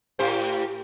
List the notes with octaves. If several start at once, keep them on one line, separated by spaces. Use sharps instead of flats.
A2 G4 C5